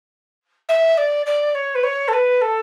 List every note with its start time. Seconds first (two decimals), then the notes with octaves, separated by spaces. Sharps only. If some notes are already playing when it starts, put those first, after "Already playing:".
0.69 E5
0.97 D5
1.26 D5
1.55 C#5
1.75 B4
1.83 C#5
2.08 A4
2.13 B4
2.41 A4